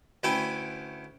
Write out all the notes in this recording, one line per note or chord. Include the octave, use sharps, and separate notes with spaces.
D2 C#4 E4 B4 G5